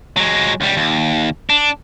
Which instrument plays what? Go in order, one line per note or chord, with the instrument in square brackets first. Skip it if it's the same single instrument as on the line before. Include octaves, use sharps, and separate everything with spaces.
[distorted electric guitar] F#3 G#3
C#2 G3
D#2
D4